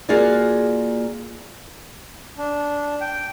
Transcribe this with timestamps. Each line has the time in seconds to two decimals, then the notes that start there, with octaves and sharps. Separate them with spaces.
0.09 A#3 F4 F#4 G#4 D5
2.38 D4
3.01 G5